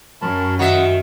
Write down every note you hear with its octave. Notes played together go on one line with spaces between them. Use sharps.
F#2 A#4 A5 B5
D#3 F#4 D#5 E5 F#5